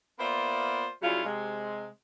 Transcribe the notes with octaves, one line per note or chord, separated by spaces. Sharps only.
A#3 B3 F4 C5 D5 E5
C#3 F#3 G3 C#4 E4 F4
C3 G#3